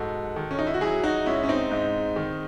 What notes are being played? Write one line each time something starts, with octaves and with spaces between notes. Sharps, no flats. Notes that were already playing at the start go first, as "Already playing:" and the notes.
Already playing: G#2 F#4 A4
D#3
C#4
D#4
E4
F#4
F#3 E4 G#4
D#4 F#4
G#2 C#4 E4
C#4
C4 D#4
G#2
D#3